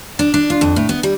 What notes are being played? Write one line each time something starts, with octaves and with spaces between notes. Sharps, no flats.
D4
D4
F4
F2
A2
B3
G3